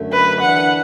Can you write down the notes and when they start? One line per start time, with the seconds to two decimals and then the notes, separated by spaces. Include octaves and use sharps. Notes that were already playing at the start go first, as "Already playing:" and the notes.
Already playing: F#2 D3 A3
0.13 B4
0.41 E3 D4 B4 F#5